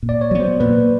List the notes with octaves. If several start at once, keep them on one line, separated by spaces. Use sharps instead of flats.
A#2
D5
C#5
F#3 B3
C5
A#2 B4